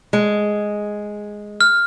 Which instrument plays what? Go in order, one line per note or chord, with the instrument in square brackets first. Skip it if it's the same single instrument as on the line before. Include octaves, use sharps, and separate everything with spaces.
[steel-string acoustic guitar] G#3
[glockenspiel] F6